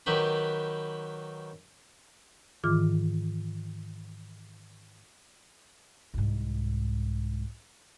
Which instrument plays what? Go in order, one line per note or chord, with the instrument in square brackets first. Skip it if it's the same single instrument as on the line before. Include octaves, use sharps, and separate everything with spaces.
[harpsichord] D#3 F#3 G4 B4 B5
[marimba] G#2 D#3 E3 F4 D6 F6
[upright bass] C2 G#2